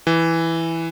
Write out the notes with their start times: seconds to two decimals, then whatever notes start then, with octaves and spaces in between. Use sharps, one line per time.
0.07 E3